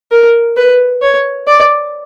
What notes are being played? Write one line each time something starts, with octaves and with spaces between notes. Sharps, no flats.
A#4
B4
C#5
D5